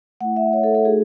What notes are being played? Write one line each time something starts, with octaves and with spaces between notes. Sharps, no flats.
A3 E4 F#5
E5
C#5
A4
A4
A3 D#4 F#4 G#4